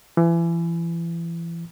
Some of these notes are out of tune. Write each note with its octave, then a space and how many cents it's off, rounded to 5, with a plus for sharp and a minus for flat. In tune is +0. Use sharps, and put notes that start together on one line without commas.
E3 +30